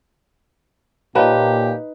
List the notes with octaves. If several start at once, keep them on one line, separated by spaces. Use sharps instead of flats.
A#2 D#4 G4 B4 C#5 F5 A5